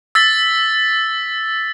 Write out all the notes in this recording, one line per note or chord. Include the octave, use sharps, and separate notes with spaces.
E6 A6 B6 G7